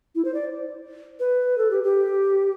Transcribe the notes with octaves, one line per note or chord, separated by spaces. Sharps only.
E4
C5
D5
B4
A4
G4
G4